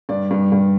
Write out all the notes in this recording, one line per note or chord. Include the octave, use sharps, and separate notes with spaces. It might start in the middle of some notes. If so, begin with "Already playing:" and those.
G2 D5
G2
G2